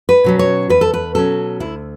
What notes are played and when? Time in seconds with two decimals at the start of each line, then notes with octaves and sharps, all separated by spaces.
0.09 B4
0.24 B2 F#3 C#4
0.39 C#5
0.69 E2 B4
0.81 A4
0.93 B4
1.15 B2 F#3 C#4 A4
1.60 D2 E4